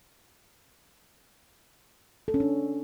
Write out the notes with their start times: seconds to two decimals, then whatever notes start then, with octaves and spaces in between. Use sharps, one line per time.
2.28 A4
2.34 C#4
2.40 D4